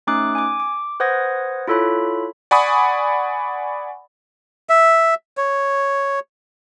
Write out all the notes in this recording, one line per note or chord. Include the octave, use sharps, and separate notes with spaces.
A3 C#4 D#4 D6 D#6 F#6
G#5 D6
D6
B4 C5 F#5 D#6 G#6 A#6
E4 F4 A4 C#5 B5
D5 F#5 G#5 B5 C#6 D#6
E5
C#5